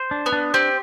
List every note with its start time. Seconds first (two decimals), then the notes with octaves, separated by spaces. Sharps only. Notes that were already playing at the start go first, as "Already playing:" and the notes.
Already playing: C5
0.11 D4
0.26 B3
0.32 D4
0.54 C4 G4